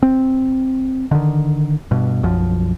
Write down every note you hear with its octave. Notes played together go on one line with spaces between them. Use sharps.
C4
D3 D#3
G2 B2
B1 F#2 F3